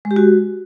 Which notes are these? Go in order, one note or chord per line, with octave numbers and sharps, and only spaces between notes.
G#3
G4
F#4